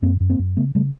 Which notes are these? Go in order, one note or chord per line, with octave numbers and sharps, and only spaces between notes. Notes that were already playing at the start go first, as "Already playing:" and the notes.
F#2 A#3 C4
F#2
A#3 C4
F#2
C#3 A3 B3
C#3 G3 A3